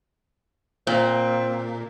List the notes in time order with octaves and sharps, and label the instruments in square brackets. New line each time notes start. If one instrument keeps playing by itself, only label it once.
[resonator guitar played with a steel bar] A#2 [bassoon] C4